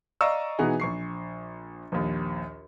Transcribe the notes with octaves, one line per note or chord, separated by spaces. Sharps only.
D5 D#5 F5 A#5 C#6 E6
B2 E3 B3 D#4 G#4
A#1 C#6 C7
A#1 D#2